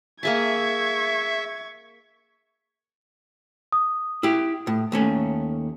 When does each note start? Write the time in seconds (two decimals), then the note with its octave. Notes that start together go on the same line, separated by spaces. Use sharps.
0.23 A#3 G#4 E5 A5 C#6 G#6
3.72 D#6
4.23 E4 G4
4.67 A2
4.92 D#2 A3 C#4